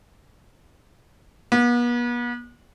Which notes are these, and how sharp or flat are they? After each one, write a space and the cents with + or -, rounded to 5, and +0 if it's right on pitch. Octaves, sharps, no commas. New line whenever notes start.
B3 -40